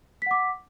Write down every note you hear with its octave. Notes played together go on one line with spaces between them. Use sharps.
F#5 D6 B6